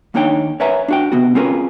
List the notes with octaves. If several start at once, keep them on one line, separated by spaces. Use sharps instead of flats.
D#2 A#3 D4 D#4 C#5 G5
A#4 B4 C#5 E5 G#5 A#5
D4 F#4 G5
C3 B3 F#4
C4 C#4 F4 G#4 A#4 B4